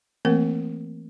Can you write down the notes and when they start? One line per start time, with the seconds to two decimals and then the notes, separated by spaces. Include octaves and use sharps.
0.25 E3 A3 A#3 C4 A#4